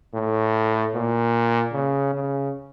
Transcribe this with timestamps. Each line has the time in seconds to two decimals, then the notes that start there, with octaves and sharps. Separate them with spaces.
0.14 A2
0.95 A#2
1.73 C#3
2.14 C#3